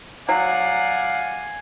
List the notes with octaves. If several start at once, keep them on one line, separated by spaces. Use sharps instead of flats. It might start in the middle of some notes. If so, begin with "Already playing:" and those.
F#3 D5 F5 F#5 G#5